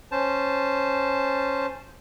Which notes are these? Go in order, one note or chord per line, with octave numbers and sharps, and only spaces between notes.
C#4 C5 A5